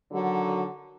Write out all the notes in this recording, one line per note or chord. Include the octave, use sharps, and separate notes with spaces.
D3 D#3 F#3